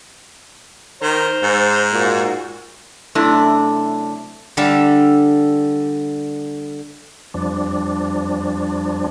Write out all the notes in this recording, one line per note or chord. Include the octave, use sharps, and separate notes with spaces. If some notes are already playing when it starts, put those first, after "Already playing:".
D#3 C5 A#5
G#2
A#2 A#3 F#4
F#2 C3 A3 D4 E4
D3 G3 A4 E5 F5
F2 F3 G3 D4